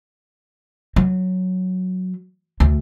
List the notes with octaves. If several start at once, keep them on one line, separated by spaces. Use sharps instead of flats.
F#3
D2